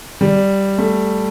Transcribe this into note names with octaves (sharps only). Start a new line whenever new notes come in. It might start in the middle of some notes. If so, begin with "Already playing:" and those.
G3
A3